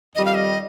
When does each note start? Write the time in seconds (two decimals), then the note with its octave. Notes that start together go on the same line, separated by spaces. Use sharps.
0.15 F2 D#3 G3 D#5
0.25 F5
0.34 D#5